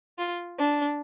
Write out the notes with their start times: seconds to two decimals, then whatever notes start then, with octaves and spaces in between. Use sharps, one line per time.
0.18 F4
0.59 D4